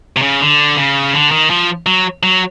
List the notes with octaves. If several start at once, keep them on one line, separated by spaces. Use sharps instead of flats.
C3
C#3
D3
C#3
D3
D#3
F3
F#3
F#3